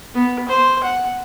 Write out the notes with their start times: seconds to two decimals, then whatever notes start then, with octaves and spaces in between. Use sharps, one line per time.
0.14 B3
0.48 C5
0.84 F#5